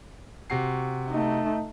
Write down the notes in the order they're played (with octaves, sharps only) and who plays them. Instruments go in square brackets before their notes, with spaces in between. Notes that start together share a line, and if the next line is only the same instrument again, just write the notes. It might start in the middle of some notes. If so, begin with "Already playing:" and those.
[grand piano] C3 F#4 C7
[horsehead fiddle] A3 D#4